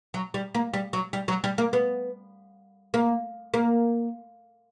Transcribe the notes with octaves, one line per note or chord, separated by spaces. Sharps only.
F#3
G3
A#3
G3
F#3
G3
F#3
G3
A#3
B3
A#3
A#3